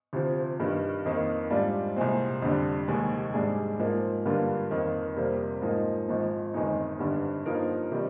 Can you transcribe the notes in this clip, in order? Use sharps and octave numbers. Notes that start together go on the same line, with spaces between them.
D2 C3 F3 C4
G2 D#3 G3
F2 D#3 A#3
G#2 G3 D4 F4
C2 A#2 G#3 C4
F2 D3 G3
F1 D#2 D#3 G#3
G#2 G3 D4 G#4
G#2 F3 A#3
G2 D3 G3 A#3 F4
F2 D#3 A#3
F2 C3 G3 A#3
G#2 F3 A#3 D#4
G#1 G#2 F3
G1 F2 D#3 G#3 D#4
G#1 G2 D3 G3
G2 F3 A#3 D#4 A#4
C3 D#3 G3